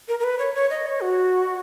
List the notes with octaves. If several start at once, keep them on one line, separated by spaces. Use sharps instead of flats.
A#4
A#4
B4
C#5
C#5
D#5
C#5
F#4